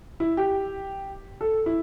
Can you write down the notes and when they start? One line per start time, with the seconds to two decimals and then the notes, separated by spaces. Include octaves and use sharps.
0.20 E4
0.37 G4
1.41 A4
1.66 E4